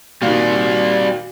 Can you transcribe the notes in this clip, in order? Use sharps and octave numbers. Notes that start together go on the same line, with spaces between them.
A#2 D#3 G3 C4 F#4